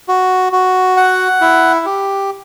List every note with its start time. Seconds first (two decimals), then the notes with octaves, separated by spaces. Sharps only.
0.08 F#4
0.52 F#4
0.97 F#5
1.41 E4
1.86 G4